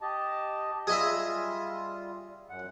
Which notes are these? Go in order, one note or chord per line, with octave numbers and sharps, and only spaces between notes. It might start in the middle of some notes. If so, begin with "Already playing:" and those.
G4 D#5 A5
G3 F4 G#4 D#5 E5
F#2 F#5